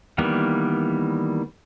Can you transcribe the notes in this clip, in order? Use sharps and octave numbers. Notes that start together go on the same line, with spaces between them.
D#3 E3 G3 A#3 B3